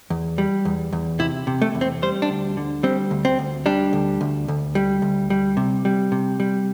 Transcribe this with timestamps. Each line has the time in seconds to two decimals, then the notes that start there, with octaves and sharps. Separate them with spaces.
0.10 E2
0.38 G3
0.65 E2
0.93 E2
1.20 C3 E4
1.47 C3
1.62 A3
1.75 E2
1.81 C4
2.02 G3 C5
2.22 D4
2.30 D2
2.57 D3
2.83 G3 C4
3.11 D2
3.25 C4
3.39 D2
3.66 G3 D4
3.93 D2
4.21 D2
4.48 D2
4.75 G3
5.02 D2
5.30 G3
5.57 C3
5.85 G3
6.12 C3
6.40 G3